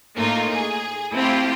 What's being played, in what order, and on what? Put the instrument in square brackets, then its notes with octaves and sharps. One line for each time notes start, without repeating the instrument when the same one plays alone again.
[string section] A2 A3 A#3 D#4 F4
G#4
A3 C4 E4 F4 G4